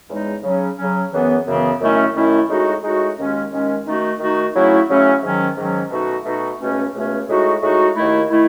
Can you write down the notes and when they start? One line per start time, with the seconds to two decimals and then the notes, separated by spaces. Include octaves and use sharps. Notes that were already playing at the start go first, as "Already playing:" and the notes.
0.08 E2 C#3 G#3 D#4
0.43 C#3 F#3 C#4
0.77 C#3 F#3 C#4
1.11 F#2 C#3 E3 B3
1.45 F#2 C#3 E3 B3
1.80 F#2 D#3 A3 C#4 E4
2.14 F#2 D#3 A3 C#4 E4
2.48 A2 G#3 D#4 F#4
2.82 A2 G#3 D#4 F#4
3.17 D#2 D#3 G#3 C#4
3.51 D#2 D#3 G#3 C#4
3.85 D#3 A3 D#4 F#4
4.19 D#3 A3 D#4 F#4
4.54 C#3 F#3 A3 C#4 E4
4.88 C#3 F#3 A3 C#4 E4
5.22 G#2 D#3 F#3 C#4
5.56 G#2 D#3 F#3 C#4
5.90 B2 A3 D#4 F#4
6.24 B2 A3 D#4 F#4
6.59 C#2 B2 A3 C#4
6.93 C#2 B2 A3 C#4
7.28 A2 G#3 D#4 F#4
7.61 A2 G#3 D#4 F#4
7.95 D#2 D#3 A3 E4
8.30 D#3 A3 E4